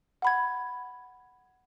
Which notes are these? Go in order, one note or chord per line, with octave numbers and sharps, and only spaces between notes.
F#5 B5 G#6